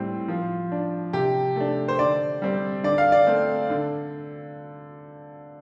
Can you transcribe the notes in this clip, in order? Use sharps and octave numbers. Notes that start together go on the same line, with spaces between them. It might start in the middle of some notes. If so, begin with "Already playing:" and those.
Already playing: A2 G3 C4
F3
D4
C3 G4
A3 D4
C5
D3 D5
G3 C4
D3 D5
F5
D5
A3 C4
D3